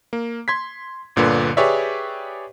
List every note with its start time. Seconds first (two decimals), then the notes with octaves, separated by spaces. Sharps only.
0.13 A#3
0.48 C6 G#6 B6
1.16 G1 A#2 D3 B4
1.57 G4 G#4 B4 C#5 D5 E5